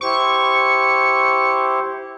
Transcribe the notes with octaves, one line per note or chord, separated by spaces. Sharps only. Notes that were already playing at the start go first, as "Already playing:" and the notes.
E4 G4 C5 C#6